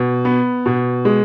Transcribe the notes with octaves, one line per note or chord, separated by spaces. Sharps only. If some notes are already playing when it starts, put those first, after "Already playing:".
Already playing: B2
B3
B2
G#3